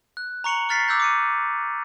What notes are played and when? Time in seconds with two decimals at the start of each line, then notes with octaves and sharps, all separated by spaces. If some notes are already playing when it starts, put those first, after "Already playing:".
0.17 F#6
0.44 A#5 C#6 C#7 F7 F#7
0.69 C#6 F6 A6 B6 C7
0.88 D6 E6 F#6 G6 A#6
1.00 D6 C#7 D#7